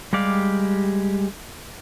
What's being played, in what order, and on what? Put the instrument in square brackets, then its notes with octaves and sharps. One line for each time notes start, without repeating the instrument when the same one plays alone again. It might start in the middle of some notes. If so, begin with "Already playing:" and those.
[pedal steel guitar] G3 G#3 G4 D5 F5